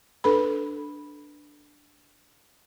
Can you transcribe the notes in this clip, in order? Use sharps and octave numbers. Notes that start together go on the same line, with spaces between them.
D4 A4 B4 B5